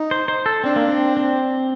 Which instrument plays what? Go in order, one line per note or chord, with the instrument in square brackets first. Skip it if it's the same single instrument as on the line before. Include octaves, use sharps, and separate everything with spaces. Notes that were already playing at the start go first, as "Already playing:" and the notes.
Already playing: [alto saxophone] D#4
[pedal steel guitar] C5
C5
A4
[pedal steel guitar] C4 [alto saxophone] D4
[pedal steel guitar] A#3
C4
C4